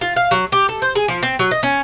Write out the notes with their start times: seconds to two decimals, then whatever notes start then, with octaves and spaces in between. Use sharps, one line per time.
0.01 F4
0.16 F5
0.31 F#3
0.52 G4
0.69 A4
0.82 C5
0.95 G#4
1.08 F3
1.23 C4
1.39 F#3
1.51 D#5
1.63 C#4